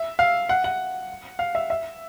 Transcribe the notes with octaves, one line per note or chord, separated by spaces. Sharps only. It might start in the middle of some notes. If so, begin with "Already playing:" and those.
Already playing: E5
F5
F#5
F#5
F5
E5
E5